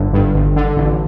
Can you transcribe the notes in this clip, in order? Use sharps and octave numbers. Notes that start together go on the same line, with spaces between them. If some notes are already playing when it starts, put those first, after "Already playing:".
Already playing: G1 D3
G2
G1
D3
A1